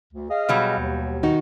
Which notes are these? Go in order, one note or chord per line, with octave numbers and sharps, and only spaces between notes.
D2
G#4 D#5 F5
B2 F#3 G3
D#2
D#3 D#4 F#4